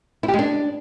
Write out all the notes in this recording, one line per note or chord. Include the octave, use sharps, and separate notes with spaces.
E4
G4
G#3
D4